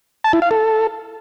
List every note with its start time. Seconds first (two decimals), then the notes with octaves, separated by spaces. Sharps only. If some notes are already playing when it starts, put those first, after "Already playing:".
0.24 A5
0.33 E4
0.42 F5
0.51 A4